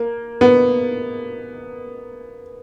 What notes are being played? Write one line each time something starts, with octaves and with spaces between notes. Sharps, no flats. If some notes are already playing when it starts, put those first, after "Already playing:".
Already playing: A#3
B3